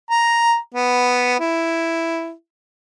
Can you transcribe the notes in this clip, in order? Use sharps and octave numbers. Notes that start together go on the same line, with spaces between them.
A#5
B3
E4